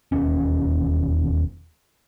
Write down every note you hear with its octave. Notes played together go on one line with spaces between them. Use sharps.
E1 D#2 C#4